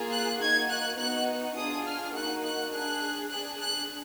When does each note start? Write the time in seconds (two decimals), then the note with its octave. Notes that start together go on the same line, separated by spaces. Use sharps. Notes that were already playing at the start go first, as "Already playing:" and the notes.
Already playing: A#3 F4 G#4
0.11 F#6
0.40 A#3 D#4 F#4 G#6
0.70 F#6
0.98 B3 D#4 F#4 F#6
1.56 D4 F4 G#4 D#6
1.86 F6
2.15 A#3 D#4 F#4 F#6
2.43 F#6
2.73 D4 G#4 F#6
3.31 D4 G#4 F#6
3.60 F#6